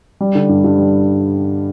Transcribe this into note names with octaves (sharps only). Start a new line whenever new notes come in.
G3
D3
G2
G2
G3